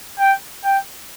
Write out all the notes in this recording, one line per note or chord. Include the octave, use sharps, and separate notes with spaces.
G5
G5